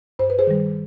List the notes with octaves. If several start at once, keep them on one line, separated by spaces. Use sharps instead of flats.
G2 C5
B4
G#4 C5
D#3 G3